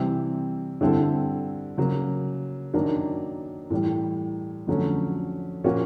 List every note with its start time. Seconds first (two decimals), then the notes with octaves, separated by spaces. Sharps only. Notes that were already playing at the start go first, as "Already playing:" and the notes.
Already playing: C3 E3 G3 C4 E4
0.81 D3 G3 C4 E4 A4
1.78 C#3 F#3 A#3
2.74 F#2 D#3 F#3 A#3 D4
3.70 A2 E3 G3
4.67 F2 D3 F#3 A3 C#4
5.64 A#2 F3 A#3 C#4 F#4